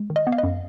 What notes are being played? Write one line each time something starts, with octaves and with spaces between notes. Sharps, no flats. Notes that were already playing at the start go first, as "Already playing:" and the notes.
Already playing: G#3
D#3
D#5
B3
F5
D#5
F#2